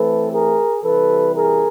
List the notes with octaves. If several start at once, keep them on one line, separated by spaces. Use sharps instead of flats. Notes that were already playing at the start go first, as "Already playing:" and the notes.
Already playing: E3 A3 C4 A4 B4
G#4 A#4
C3 E3 G3 A4 B4
G#4 A#4